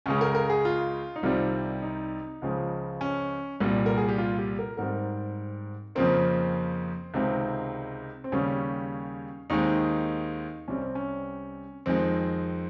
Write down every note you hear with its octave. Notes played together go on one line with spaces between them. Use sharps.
C#2 C#3 G#3 C#4
A#4
A#4
G#4
F4
D#4
C2 C3 D#3 G3 C4 F4
D#4
C#2 C#3 F3 G#3
C#4
C2 A#2 G3
A#4
G#4
G4
F4
G4
A#4
G#2 G3 C4 A#4
F2 C#3 F3 A#3 C4
C#2 C3 D#3 G#3 C4
C4
D#2 C#3 G3 C#4
D#2 D#3 G#3 C4 D#4
C2 C3 G3 C4 C#4
C4
C#4
F2 D#3 G#3 C4